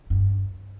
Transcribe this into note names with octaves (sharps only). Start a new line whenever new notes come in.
G2